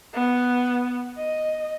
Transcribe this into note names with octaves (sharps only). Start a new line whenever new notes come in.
B3
D#5